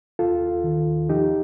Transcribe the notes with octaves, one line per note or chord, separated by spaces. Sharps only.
D#2 F4 A4
D#2
D#3
D#2
F3 D#4 G4